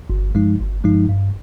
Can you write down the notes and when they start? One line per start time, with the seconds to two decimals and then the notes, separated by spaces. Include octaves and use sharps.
0.10 G1
0.35 G2 F3 G#3 D#4
0.60 G1
0.84 G2 F3 G#3 D#4
1.09 G2